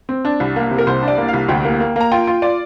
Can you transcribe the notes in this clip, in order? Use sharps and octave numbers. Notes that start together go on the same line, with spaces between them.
C4
D4
C2
A#3
C3
A#4
C2 C5
D4
D5
A#3
F5
C2
D2 G5
A#3
A#3
A#3 A#5
F4 G5
F4
F4 D5